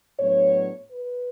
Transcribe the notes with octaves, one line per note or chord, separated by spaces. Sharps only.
A2 F#3 B3 D4 C#5
B4